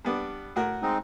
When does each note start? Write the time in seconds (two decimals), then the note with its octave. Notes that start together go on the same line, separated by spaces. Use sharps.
0.05 G3 B3 D4
0.56 A2 F#4 A#4
0.82 G#3 C4 D#4